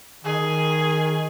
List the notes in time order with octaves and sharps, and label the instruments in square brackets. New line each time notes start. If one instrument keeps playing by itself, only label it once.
[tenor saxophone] D#3 [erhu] G#4